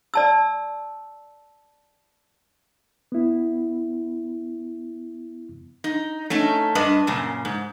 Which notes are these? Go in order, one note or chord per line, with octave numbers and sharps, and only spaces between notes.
D5 A5 E6
B3 E4
D#4
A3 C#4 D#4
G2 D4 B4 D#5
F#2 A#2 C#3
G#2